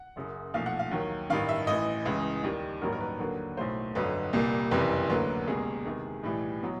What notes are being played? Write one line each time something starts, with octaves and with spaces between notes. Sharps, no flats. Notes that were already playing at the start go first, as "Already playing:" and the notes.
Already playing: F#5
F#1 F#2 C#3
B1 A#2 F3 A3 F5
F#5
F5
D#2 D#3 F#3
A1 G2 D#3 F5
E5
A1 A2 E3 D#5
C#2 C#3 E3
D#2 D#3 G3
A1 G2 D#3 F#3 A#3 A#4
A#4
B4
D#2 D3 F#3 A#3
B1 A2 F#3 A3 C5
G1 F2 D3 F#3 B4
C2 A#2 G3 A#3
F#1 F2 C3 E3 G3 B4
D2 D3 F#3 A#3 B4
C#2 B2 G3 A#3 G#4
E2 C3 D#3 G#3
B1 A2 E3 G3
B2 F#3